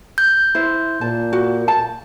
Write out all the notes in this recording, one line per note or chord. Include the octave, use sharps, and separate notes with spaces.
G6
E4 C5
A#2 A5
F#4
A5